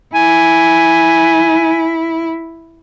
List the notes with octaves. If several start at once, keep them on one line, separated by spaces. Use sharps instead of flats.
E4 G#5